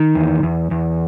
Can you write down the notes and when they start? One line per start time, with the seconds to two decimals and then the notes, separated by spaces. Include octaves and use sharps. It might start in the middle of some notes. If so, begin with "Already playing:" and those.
Already playing: D#3
0.15 E2
0.43 E2
0.71 E2